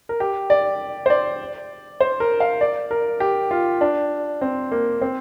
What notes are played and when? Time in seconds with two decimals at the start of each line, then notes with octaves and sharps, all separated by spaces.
0.09 A#4
0.20 G4
0.50 D5
1.06 C5
1.10 D5
2.00 C5
2.20 A#4
2.40 F5
2.61 D5
2.91 A#4
3.20 G4
3.51 F4
3.81 D4
4.41 C4
4.71 A#3
5.02 C4